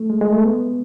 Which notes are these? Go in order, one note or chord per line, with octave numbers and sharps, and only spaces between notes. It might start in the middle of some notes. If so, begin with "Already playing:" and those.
Already playing: A3
G#3
G#3
A3
B3